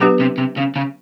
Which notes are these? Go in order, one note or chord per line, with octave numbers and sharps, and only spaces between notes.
B2 F#3 B3 D4 G4 B4
C3
C3
C#3
C#3